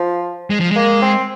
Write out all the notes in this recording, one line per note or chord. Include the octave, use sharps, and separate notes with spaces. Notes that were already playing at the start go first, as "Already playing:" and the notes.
Already playing: F3
G#3
F3
G#3 A#3
C4